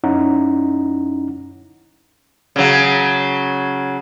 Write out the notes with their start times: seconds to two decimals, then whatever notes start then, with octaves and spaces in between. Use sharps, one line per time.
0.04 F#2 C#4 D#4 E4 F#5 A#5
2.56 C#3 F#3